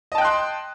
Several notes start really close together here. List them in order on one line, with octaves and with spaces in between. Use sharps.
D#5 A5 G5 F#6 C6